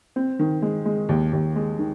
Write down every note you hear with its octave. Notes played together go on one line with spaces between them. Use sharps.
C4
D#3
G#3
G#3
D#2
D#2
G#3
D#3